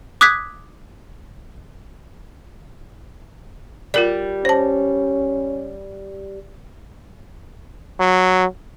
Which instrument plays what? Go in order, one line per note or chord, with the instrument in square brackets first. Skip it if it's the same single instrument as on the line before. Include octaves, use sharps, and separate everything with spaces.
[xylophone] D6 D#6 F#6 G#6 B6
[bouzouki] G3 [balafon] F4 A#4 D5
[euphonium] C#4 [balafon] C5 A5
[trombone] F#3